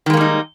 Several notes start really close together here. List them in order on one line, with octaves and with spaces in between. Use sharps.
D#3 G#3 A#3 G3 D#4